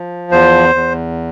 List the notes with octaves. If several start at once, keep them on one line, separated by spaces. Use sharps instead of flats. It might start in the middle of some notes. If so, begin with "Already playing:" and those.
Already playing: F3
E2 C5
E2